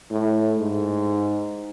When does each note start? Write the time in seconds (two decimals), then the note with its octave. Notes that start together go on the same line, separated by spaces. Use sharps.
0.11 A2
0.59 G#2